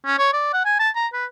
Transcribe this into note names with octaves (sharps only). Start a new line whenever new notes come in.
C#4
C#5
D5
F#5
G#5
A5
A#5
B4